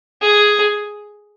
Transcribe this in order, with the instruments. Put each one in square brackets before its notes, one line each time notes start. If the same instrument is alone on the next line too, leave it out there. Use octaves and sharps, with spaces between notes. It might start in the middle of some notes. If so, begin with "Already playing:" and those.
[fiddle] G#4